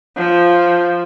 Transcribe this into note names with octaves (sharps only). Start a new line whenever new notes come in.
F3